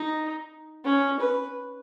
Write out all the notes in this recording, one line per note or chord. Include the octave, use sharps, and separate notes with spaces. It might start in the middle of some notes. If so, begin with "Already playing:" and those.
Already playing: D#4
C#4
B4